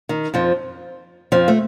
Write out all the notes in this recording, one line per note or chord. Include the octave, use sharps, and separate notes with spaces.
D#3
F2 F3
F2 F3
A3